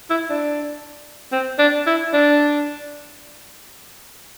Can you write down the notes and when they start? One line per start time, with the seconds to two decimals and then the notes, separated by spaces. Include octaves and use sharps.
0.10 E4
0.30 D4
1.32 C4
1.59 D4
1.87 E4
2.13 D4